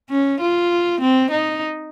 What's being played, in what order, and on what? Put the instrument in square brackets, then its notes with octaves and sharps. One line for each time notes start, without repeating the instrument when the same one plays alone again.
[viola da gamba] C#4
F4
C4
D#4